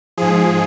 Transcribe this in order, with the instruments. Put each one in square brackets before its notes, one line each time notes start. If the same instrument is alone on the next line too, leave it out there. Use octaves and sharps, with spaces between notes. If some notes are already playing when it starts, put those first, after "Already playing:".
[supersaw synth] G#2 F3 G#4